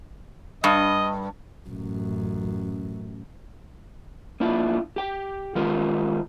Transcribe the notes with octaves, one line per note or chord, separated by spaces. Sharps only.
G2 D#5
A1 F#2
A#3 D4 E4 F4
G4 G5
D#3 G#3 F4 G4 A#4